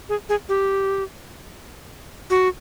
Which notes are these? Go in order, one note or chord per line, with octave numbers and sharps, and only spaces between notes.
G#4
G#4
G4
F#4